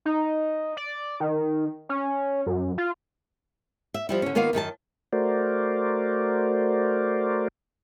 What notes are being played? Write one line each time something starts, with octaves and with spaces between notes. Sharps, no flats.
D#4
D5
D#3
C#4
F#2
F4
E5
F3 G3 E4
D3 C#4
D#3 A#3 B3 F4 F5
F#2 D#3 G#4 A5
A3 F#4 A#4 C5 D5